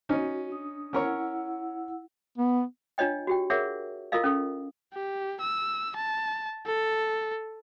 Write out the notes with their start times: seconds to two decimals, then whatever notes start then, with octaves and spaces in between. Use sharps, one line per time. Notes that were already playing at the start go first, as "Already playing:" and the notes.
0.09 C#4 D#4 F#4
0.50 D4 D#6
0.93 C#4 E4 A#4 C#5 F#5 E6
2.38 B3
2.98 D4 F4 C#5 D#5 G5
3.27 F#4 G4 G5
3.50 G#4 A#4 C#5 E5 F#5 C#6
4.12 E4 F4 A4 A#4 D#5 F5
4.24 C#4 A4
4.93 G4
5.41 E6
5.96 A5
6.66 A4